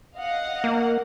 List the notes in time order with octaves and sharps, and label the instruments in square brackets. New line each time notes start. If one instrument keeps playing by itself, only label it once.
[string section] D#5 F5 F#5
[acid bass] A#3